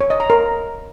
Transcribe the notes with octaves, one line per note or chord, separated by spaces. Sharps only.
C#5
D#5
A#5
A#4